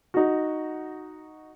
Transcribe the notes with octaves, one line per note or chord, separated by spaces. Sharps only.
D#4 F#4